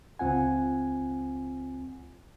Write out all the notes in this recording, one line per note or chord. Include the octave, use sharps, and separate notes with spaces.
C#2 C4 F4 F#5 G#5